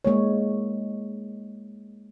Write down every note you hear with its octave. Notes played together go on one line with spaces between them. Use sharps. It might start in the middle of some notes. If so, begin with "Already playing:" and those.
G#3 A#3 C#5